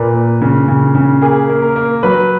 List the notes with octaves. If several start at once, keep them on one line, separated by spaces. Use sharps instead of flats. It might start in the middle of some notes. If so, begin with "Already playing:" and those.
Already playing: A#2 A#3 B4
A#3
C#3
C#3
C#3
A#3 G#4
A#3
A#4
A#3
F#3 B4